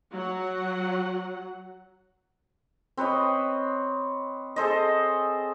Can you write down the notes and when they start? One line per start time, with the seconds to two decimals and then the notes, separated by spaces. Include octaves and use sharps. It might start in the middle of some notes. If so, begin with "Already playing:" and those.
0.12 F#3 F#5
2.97 C4 B4 C#5 D#5
4.56 G#4 A4 C5 D#5